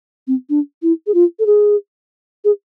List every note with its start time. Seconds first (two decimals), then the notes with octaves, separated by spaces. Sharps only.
0.27 C4
0.49 D4
0.82 E4
1.07 G#4
1.14 F4
1.39 A4
1.46 G#4
2.44 G#4